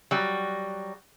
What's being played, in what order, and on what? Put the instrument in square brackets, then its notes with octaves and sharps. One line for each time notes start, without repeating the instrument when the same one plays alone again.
[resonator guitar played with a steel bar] F#3 G3